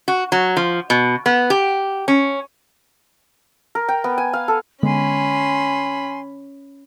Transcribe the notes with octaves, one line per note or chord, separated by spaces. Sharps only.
F#4
F#3
F3
B2
B3
G4
C#4
A#4
G5
B3
G#5
F5
A4
D3 G#3 B3 C#4 G#5 B5 C6